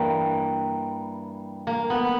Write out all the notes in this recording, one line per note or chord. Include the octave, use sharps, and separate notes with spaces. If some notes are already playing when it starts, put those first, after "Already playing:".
Already playing: G2 E3 G3 A#3
A#3
B3